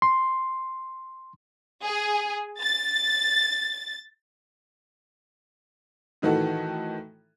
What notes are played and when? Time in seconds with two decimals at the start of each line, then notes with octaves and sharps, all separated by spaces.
0.02 C6
1.83 G#4
2.62 A6
6.22 A2 D#3 E3 F#4 A4